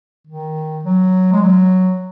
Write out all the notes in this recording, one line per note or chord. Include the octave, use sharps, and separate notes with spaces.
D#3
F#3
G#3
F#3